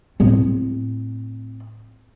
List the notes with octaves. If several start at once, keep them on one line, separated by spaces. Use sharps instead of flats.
A2 C4